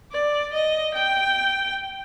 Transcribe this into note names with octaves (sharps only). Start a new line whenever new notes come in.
D5
D#5
G5